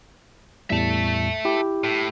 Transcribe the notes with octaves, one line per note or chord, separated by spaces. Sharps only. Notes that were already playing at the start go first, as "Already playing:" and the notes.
E2 A2 G3 E5 A5
E4 G4
A2